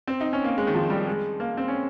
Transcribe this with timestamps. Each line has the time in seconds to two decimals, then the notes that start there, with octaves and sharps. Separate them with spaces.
0.08 C4
0.20 D#4
0.33 C#4
0.44 A#3
0.58 G#3
0.67 D#3
0.74 F3
0.90 G3
1.07 G#3
1.40 A#3
1.57 C4
1.68 C#4